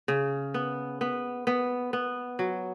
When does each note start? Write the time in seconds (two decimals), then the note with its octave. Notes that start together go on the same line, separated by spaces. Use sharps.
0.08 C#3
0.54 B3
1.01 B3
1.47 B3
1.93 B3
2.39 F#3